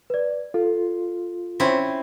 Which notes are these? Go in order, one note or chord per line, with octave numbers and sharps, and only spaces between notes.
B4 D5
F4 A4
C4 C#4 E4